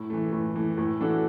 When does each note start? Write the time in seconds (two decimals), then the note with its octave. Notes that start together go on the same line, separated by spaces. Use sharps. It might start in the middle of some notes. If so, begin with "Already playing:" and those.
Already playing: A2
0.10 E3 A3
0.32 A2
0.56 E3 A3
0.78 A2
1.00 E3 D4 F#4 A4